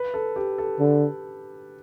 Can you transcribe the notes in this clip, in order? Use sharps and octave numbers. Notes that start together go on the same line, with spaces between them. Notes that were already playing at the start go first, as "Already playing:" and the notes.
Already playing: B4
A4
G4
A4
D3